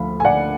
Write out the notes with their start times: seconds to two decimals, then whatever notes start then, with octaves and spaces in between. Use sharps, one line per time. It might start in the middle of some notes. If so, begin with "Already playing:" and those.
Already playing: D2 F3 F5 B5
0.20 G#5
0.25 D5 F#5